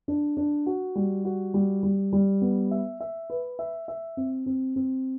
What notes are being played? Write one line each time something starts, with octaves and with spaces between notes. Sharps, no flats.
D4
D4
F#4
G3
F#4
G3
G3
G3
B3
E5
E5
B4
E5
E5
C4
C4
C4